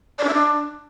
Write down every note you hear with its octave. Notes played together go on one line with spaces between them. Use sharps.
D5
D4
E5
D4